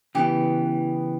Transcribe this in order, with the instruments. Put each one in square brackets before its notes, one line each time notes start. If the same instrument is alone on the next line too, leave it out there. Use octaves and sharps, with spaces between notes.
[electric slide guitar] C#3 E3 B3 [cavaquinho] G4